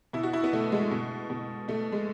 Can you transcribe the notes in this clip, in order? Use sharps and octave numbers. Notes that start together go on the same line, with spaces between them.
B2 E4
F#4
E4
B3
B2 A3
G#3
B2
B2
B2 A3
G#3